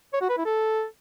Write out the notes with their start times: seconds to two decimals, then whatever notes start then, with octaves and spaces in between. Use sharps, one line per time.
0.13 C#5
0.21 F#4
0.29 B4
0.37 E4
0.46 A4